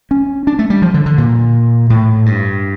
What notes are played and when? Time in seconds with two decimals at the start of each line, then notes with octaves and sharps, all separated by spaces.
0.11 C#4
0.47 D4
0.59 A3
0.70 G3
0.82 F3
0.94 D3
1.06 D3
1.18 A#2
1.90 A2
2.26 G2